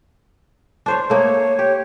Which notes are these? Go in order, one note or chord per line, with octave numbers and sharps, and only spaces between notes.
D4 C5 C#5
A3 A#3 D#4 C#5
G4